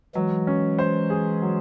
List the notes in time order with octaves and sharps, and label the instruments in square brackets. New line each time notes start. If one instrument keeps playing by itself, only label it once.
[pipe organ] E3 G#3 [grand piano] F#3
[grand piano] C#4
C5
G#4
F#3